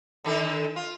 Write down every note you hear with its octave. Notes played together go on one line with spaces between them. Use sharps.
D3 D#3 A4
F4